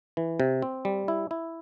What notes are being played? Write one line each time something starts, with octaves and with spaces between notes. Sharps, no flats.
E3
C3
C4
G3
E4
E4